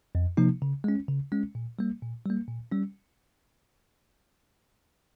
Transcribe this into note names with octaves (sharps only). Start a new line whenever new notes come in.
F2
C3 F3 A#3 D#4
C#3
G#3 C#4
C#3
G#3 C#4
A#2
G3 A#3
A#2
G3 A#3
A#2
G3 C#4